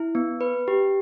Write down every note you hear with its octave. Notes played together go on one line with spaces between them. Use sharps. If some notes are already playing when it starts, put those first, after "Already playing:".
Already playing: E4
B3
B4
G4